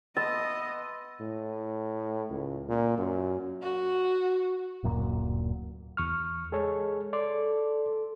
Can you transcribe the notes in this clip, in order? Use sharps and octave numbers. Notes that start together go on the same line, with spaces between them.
B3 D#5 E5 A5 C6 A6
A2
C#2
A#2
F#2
F#4
D1 F#2 A#2
E2 C#6 F6
G#3 G#4 A4 C#5
A4 D5 C6 D6